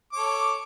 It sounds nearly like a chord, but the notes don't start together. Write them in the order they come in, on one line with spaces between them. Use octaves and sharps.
D6 C#5 A4